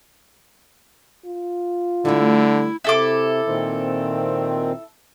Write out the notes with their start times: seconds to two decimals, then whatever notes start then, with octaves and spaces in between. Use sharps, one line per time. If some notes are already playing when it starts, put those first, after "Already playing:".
1.26 F4
2.05 D3 G3 A3 E4
2.84 C3 E4 A4 D6
3.47 A#2 D#3 C4